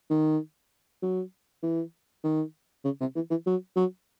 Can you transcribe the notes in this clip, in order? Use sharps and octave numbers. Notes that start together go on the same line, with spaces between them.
D#3
F#3
E3
D#3
C#3
C3
E3
E3
F#3
F#3